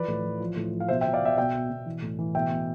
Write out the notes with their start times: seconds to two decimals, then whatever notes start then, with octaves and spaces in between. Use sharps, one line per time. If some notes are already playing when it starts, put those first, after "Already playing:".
Already playing: E3 F3 B4 D5
0.08 A2
0.24 E3
0.40 F3
0.56 A2
0.73 F3
0.80 F5
0.88 B2 C5 E5
1.01 E5 G5
1.05 B2
1.13 D5 F5
1.21 B2 E5 G5
1.37 B2 E5 G5
1.54 B2
1.70 B2
1.86 E3
2.02 A2
2.19 E3
2.35 B2 E5 G5
2.51 B2